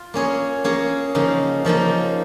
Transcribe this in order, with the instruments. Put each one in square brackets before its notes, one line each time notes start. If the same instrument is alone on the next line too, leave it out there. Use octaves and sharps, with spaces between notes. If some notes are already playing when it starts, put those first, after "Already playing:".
Already playing: [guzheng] F4
A#3 C#4 G#4 C#5
A#3 C#4 G#4 C#5
C#3 F3 A#3 D#4
C#3 F3 A#3 D#4